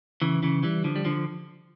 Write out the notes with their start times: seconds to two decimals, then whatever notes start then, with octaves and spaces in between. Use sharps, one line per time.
0.22 C#3 E3
0.43 C#3 E3
0.63 E3 G3
0.84 D3 F3
0.96 G3
1.05 D3 F3